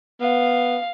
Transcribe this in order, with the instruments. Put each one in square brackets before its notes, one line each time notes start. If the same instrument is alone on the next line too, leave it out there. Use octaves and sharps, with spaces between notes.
[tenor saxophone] B3 [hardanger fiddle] F5